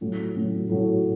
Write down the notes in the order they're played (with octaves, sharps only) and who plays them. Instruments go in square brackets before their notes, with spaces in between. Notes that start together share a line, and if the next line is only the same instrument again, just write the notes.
[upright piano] A2 F#3 A3 C#4
A2 F#3 A3 C#4
A2 F#3 A3 C#4